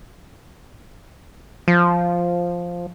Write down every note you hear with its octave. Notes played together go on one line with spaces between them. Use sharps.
F3